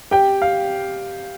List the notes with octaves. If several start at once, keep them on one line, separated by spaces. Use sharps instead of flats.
G4 G5
F5